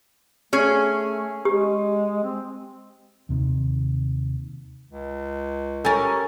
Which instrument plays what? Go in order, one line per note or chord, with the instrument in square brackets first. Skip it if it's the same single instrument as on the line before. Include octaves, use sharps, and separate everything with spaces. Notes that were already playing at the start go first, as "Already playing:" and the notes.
[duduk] A3 [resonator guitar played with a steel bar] C#4 G#4
[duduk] G#3 [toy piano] G4
[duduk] C4
[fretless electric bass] D#2 C3 D#3
[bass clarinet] C#2
[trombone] C#4 [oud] G4 A#4 [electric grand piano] A4 G#5 A6